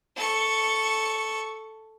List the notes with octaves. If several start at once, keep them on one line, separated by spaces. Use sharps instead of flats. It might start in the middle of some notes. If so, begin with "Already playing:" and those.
A4 C#6